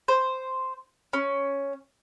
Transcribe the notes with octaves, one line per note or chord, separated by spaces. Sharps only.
C5
C#4